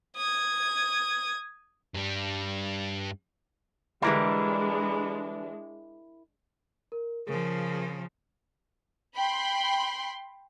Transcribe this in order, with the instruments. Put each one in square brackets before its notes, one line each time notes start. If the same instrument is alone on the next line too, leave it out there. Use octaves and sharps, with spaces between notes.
[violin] D#6 G#6
[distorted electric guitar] G2 G3
[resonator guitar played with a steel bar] D3 E3 G3 [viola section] G#3 D4 [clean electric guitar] E4 A#4
[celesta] A#4
[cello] C#3 F3 [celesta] G#4 A#4
[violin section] G5 B5 C6